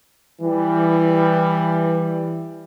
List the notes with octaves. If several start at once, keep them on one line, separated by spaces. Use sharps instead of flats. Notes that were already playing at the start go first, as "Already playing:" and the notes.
E3 G3